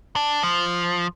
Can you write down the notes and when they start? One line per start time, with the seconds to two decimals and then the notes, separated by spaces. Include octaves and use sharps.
0.16 D4
0.43 F3